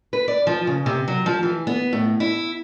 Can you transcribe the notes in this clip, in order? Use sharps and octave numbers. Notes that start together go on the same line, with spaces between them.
B4
D5
F3
C#3
C3
F#3
F3
E3
B3
A2
E4